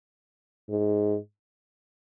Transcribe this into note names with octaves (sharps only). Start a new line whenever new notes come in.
G#2